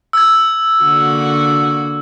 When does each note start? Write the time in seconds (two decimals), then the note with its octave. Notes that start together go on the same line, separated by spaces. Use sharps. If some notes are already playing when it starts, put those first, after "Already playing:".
0.13 E6 G#6
0.83 D3 A#3 F#4